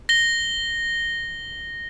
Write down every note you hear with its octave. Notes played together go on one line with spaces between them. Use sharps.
A#6 G7